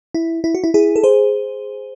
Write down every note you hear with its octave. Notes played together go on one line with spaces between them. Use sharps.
E4
E4
F#4
E4
E4 G#4
A4
G#4 C5